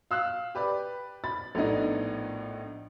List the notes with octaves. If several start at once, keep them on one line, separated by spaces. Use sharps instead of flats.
F5 E6 F#6
G4 B4 D5
B5 A6
A#1 A2 B3 D4 D#4 D#5